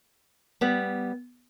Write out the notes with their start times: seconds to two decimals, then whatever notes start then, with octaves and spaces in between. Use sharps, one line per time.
0.61 G3 B3